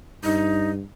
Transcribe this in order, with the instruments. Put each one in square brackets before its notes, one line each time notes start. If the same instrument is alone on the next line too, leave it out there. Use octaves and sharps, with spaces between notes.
[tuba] G2 [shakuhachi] D#4